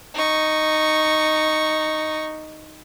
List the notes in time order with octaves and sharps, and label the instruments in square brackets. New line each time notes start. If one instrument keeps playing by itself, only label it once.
[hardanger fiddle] D#4 C#6